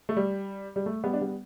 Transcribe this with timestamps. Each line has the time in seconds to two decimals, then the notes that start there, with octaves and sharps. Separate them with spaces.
0.09 A3
0.17 G3
0.76 G3
0.86 A3
1.04 G3 B3
1.13 D4
1.21 G3 B3